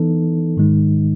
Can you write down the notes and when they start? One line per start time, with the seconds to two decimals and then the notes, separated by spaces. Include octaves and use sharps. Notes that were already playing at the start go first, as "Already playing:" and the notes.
Already playing: E3 B3 D#4 A4
0.57 G#2 D#3 G#3 D#4